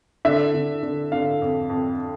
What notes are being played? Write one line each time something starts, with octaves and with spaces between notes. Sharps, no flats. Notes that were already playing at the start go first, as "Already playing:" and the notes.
D3 E5
D3
D3
D3 F5
F2
F2